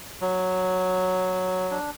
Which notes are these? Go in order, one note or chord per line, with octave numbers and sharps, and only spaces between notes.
F#3
D4